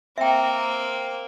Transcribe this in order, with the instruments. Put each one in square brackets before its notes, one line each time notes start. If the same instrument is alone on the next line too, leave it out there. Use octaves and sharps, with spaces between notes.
[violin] A#3 C4 [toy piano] E5 G5